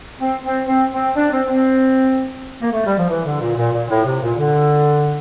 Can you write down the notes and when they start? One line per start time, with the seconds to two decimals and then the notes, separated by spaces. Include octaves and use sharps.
0.20 C4
0.44 C4
0.67 C4
0.93 C4
1.16 D4
1.32 C4
1.48 C4
2.61 A#3
2.73 A3
2.86 G3
2.97 F3
3.09 E3
3.25 D3
3.41 A#2
3.57 A#2
3.73 A#2
3.90 A2
4.05 C3
4.22 A#2
4.38 D3